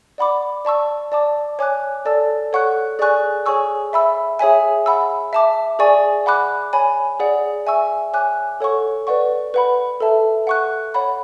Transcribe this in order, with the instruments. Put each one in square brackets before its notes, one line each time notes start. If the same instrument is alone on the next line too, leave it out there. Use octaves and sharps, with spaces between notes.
[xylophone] D5 F#5 B5 D6
D5 A5 C#6 E6
D5 A5 D6
C#5 G#5 D6 F#6
A4 D5 A5 E6
A4 C#5 F#5 C#6 F#6
G#4 D5 G#5 C#6 F#6
G#4 C#5 G#5 C#6 E6
E5 B5 E6
G#4 C#5 E5 G#5
F#5 B5 E6
E5 A5 D6
G#4 D5 G#5 C#6
F#5 B5 D6 F#6
C#5 G#5 B5
G#4 D5 F#5
E5 G#5 C#6 E6
C#5 G#5 D6 F#6
A4 C#5 F#5 C#6
B4 D5 F#5 C#6
B4 F#5 B5
A4 E5 A5
F#5 C#6 F#6
C#5 F#5 B5